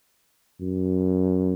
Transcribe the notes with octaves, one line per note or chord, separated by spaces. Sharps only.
F#2